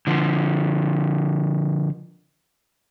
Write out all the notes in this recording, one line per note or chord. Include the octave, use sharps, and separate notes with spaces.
D3 F3